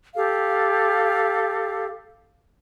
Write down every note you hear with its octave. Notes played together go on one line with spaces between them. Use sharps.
G4 A4 F5